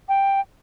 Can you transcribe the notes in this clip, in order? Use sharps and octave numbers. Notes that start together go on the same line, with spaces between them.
G5